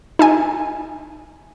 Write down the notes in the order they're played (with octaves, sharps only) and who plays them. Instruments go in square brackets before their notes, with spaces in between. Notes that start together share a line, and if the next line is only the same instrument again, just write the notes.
[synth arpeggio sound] D#4 E5 G#5